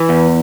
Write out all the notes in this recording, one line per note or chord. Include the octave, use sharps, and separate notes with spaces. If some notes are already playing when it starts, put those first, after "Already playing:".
Already playing: E3
E2